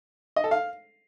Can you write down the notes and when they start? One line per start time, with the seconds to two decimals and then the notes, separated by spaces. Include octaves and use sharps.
0.36 D#5
0.44 A4
0.51 F5